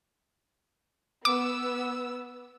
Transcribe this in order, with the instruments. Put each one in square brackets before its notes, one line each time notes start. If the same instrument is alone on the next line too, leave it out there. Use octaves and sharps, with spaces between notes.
[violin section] B3 E6 [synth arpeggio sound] D6